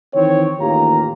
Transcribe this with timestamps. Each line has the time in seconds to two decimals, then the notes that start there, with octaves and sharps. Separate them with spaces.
0.14 D#3 E3 C4 C#5
0.60 A1 D#2 A#3 F4 G4 A#5